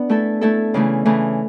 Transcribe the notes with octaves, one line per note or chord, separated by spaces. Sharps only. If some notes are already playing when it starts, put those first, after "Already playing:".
Already playing: B3 D4
A3 E4 A4
A3 E4 A4
C#3 E3 A3
C#3 E3 A3